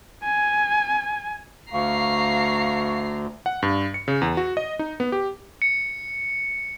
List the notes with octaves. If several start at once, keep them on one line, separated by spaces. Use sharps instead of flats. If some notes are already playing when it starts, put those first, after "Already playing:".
G#5
D2 F5 A#5 C#6 C7
F#5
G2
C#7
C#3
E2
F#4
D#5
D#4
B3
G4
C#7